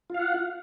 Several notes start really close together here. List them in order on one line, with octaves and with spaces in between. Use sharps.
F4 F5 F#5